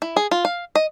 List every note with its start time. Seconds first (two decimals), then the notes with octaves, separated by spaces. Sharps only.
0.02 E4
0.16 G#4
0.31 F4
0.45 F5
0.75 D#5